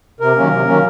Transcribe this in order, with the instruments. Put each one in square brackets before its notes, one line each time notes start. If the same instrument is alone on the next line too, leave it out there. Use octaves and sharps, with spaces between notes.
[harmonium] C3 A#4
D#3 F#3 A#3 C#4
C3
D#3 F#3 A#3 C#4